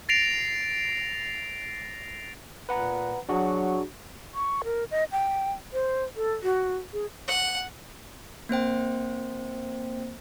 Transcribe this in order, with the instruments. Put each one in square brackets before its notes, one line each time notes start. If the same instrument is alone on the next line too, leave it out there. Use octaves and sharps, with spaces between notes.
[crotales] A6 A#6 C7 D7 F7
[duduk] A#2 [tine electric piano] B4 F#5 A#5
[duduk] F#3 [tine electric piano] D4 F#4 G#4
[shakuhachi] C#6
A#4
D#5
G5
C5
A4
F#4
G#4
[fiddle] F#5
[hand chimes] A#3 C4 C5 G5